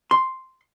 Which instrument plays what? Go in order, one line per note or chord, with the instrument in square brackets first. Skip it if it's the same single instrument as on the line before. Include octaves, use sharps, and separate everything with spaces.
[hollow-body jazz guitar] C6